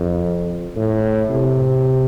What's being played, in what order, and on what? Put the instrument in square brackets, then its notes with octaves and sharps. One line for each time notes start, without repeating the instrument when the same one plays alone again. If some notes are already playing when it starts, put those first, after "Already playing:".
Already playing: [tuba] F2
A2
C3